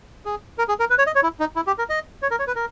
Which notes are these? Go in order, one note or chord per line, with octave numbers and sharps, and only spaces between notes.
G#4
A#4
G#4
A#4
B4
C#5
D#5
C#5
E4
D#4
E4
G4
A#4
D#5
C#5
A#4
C#5
B4
A#4